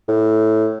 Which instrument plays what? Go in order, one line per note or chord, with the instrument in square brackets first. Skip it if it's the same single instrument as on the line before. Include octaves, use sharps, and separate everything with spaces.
[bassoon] A2